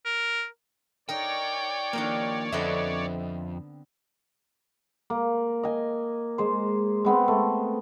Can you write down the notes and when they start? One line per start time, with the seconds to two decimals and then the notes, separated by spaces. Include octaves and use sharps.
0.05 A#4
1.09 D#4 A#4 C#5 D5 G5
1.93 D#3 F3 A#3 D4 D#4 A#4
2.52 F2 D3 B3 C4 D#5 E5
5.10 A#3
5.63 D#5 G#5
6.38 G#3 C5
7.05 G#3 B3 C4
7.28 A3